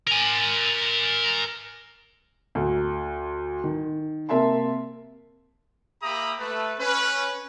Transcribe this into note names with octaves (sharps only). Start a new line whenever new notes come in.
A#4 G#5
D2
D#3
C3 A#3 E5 A5 C6
A#3 G4 E5 A#5 B5 D#6
A3 B4
C#4 B4